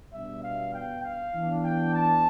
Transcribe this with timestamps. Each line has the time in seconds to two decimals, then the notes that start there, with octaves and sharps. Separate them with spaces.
0.13 B2 G3 B3 D4 E5
0.44 F5
0.74 G5
1.04 F5
1.34 E3 B3 D4
1.64 G5
1.94 A5